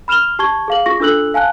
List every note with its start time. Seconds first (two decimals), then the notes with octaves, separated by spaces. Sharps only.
0.08 B5 F6 E7 F7 G7
0.39 G4 A5 C#6 G#6 G7
0.68 G#4 F5 F#7
0.86 F4 G#4 C#6 A#6
1.00 D4 F4 A4 E6 F#6 F#7
1.34 F5 G#5 A5 F#6